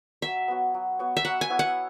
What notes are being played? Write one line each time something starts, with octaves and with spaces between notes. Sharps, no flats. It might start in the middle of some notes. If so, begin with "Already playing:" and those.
F#3 E5
B3 F#4 C#5
F#3
B3 F#4 C#5
E5
F#3 F#5
G#5
B3 E4 C#5
F#5